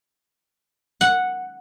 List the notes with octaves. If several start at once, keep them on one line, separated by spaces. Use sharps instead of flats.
F#5